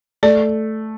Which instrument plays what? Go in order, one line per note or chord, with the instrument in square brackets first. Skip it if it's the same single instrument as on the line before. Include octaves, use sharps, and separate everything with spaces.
[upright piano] A3 [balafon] D5